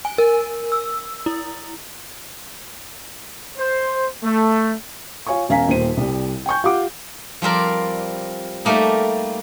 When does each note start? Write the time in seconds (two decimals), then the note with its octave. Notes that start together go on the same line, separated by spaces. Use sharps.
0.05 G#5
0.18 A#4
0.72 E6
1.26 E4
3.58 C5
4.23 A3
5.27 F4 C#5 F5 G#5 C#6
5.49 E1 C#4 F5 G#5 A#5 B6
5.68 D#1 D#2 C5 D#7
5.97 C2 G3
6.46 G5 G#5 C#6 G6
6.64 F4 G4 F#5 D6
7.42 F3 G3 C4 A#4 D5
8.65 G3 A3 A#3 D#4